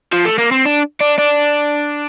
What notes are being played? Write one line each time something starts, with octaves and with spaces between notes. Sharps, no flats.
F3
A3
A#3
C4
D4
D4
D4